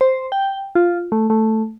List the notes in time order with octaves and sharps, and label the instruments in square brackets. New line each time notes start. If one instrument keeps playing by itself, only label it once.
[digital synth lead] C5
G5
F4
A3
A3